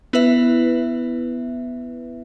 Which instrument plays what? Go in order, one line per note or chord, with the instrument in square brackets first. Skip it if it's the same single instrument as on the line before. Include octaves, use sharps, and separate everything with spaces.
[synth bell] B3 E4 B4 E5